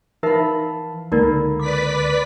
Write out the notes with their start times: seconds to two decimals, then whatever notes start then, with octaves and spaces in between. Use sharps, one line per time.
0.23 E3 D#4 A#4 E5 F5 A5 B5
1.12 C#2 D3 A#3 D#4 A#4 D5 B5
1.60 B4 D5 D6 B6